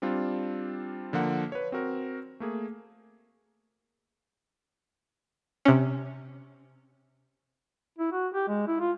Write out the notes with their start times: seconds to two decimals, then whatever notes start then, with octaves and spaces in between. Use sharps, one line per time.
0.02 G3 C4 D4 F4
1.13 D3 F3 A#3 F#5
1.52 B4 C#5
1.72 C4 F#4 A#4
2.40 A3 A#3 G#4
5.65 C3 C#4
7.98 E4
8.12 F#4
8.34 G4
8.48 G#3
8.68 E4
8.80 F4